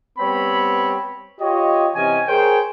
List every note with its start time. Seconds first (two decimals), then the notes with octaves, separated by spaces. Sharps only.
0.19 G3 B3 C4 C#5 B5
1.40 F4 G4 C#5 D#5
1.95 C3 E3 C#4 D#5 G#5
2.27 G#4 A#4 C5 C#5 G5